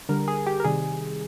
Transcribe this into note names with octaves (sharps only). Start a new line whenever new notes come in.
D3 G3 A#4
G#4
G4
A#4
C3 D#3 G3 G#4